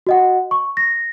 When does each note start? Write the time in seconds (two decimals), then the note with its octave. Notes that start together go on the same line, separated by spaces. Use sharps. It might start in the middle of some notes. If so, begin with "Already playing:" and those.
0.07 F#4 D#5 F#5
0.51 C#6
0.77 A#6